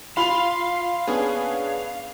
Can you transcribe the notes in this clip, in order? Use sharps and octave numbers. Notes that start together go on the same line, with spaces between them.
F4 F5 B5 C6 F7
B3 C#4 D4 G#4